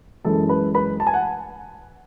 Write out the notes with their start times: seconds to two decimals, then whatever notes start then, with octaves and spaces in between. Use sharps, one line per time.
0.25 F#2 E3 G#3 A4 A5
0.49 B4 B5
0.75 B4 B5
1.00 A5
1.07 G#5
1.14 F#5